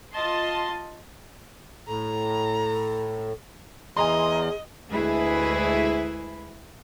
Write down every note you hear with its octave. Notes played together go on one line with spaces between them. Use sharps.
F4 D#5 A5 C6
A2 A4 A#5
E2 G#4 D#5 G#5 A#5 C6
D2 G#3 E4 G#4 B4